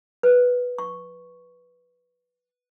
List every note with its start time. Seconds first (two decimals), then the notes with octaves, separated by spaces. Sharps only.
0.23 B4
0.78 C#6